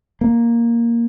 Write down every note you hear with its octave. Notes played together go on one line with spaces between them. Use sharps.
A#3